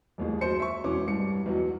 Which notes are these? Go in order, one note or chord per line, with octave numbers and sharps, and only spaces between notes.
D#1 A1 D#2 G#4
F#2 C5 C#7
E5 C#6
E1 B2 E3 C#4 D6
C2 G2 C#7
B1 E2 F#3